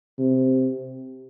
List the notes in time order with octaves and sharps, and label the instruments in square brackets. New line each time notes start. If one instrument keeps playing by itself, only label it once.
[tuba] C3